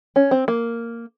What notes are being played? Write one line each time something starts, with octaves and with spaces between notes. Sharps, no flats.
C#4
C4
A#3